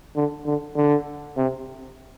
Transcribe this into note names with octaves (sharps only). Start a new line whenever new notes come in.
D3
D3
D3
C3